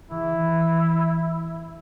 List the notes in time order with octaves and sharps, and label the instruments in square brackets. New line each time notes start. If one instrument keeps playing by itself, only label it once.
[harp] E3 [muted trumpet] E4